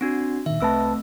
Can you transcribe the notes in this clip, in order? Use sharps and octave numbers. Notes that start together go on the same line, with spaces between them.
C4 D4 F#4
A#2 D#3 E5
C2 A3 C4 B4 A5 E6